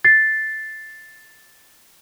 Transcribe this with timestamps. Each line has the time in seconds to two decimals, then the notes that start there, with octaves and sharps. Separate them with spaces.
0.05 A6 C7